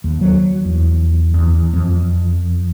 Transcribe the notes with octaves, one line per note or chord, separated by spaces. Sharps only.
D#2
F#3
E2
E2
F2